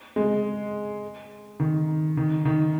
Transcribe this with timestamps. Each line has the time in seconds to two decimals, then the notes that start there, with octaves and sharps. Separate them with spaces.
0.16 G#3
1.60 D#3
2.17 D#3
2.45 D#3